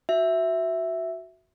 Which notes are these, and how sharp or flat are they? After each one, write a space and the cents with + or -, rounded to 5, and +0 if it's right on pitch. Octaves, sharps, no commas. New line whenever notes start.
F#4 +0 E5 +0